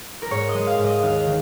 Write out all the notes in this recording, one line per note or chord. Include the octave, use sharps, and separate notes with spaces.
A#4
G#2 C#5
D#5
G#3
F5
G#2
D#5
D#2 F5
D#3